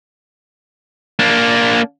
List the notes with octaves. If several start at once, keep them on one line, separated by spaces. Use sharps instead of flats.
A#3 D4